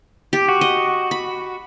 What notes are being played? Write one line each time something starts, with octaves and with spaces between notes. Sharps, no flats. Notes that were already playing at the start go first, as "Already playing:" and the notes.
G4
F#4
D#5
B5